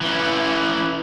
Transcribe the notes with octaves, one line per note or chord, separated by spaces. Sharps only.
E3 C#4